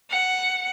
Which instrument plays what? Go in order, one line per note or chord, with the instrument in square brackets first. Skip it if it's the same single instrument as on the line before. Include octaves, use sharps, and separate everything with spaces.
[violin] F#5